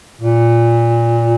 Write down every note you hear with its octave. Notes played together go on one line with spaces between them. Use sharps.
A#2